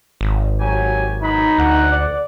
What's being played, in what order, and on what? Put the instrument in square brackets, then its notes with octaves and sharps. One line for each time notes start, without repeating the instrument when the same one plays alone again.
[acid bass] G#1
[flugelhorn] F#3 [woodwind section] G4 G#5
[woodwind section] B2 F#3 B5 [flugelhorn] D#4
[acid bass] D2 [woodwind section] F#5
[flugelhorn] D5